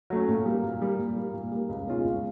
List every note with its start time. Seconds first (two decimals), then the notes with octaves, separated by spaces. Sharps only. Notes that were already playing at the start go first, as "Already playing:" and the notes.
0.10 F#3 A3 C#4
0.28 A#2
0.46 G3 A#3
0.63 A#2
0.81 G3 A#3
0.99 A#2
1.16 G3 A#3
1.33 A#2
1.52 G3 A#3
1.69 C#2
1.87 B2 G#3 C#4 F4
2.04 C#2